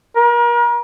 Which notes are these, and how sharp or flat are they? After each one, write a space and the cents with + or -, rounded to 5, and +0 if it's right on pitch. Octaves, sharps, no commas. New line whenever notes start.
A#4 +35